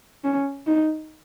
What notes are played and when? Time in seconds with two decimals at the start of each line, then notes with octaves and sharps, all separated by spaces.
0.24 C#4
0.67 D#4